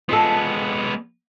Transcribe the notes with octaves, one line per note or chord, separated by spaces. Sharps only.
G#3 B3 F4 A4